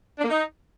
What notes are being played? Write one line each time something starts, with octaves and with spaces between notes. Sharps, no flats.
D4
A#3
D#4